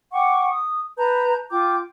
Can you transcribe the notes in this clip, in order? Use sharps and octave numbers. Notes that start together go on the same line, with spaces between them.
F#5 G5 C#6 D6
D#6
B4 A5 A#5 G6
F4 G5 D6 G6